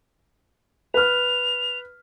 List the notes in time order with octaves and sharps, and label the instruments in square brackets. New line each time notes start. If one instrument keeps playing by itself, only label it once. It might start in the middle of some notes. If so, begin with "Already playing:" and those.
[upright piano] B4 F6 [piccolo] F7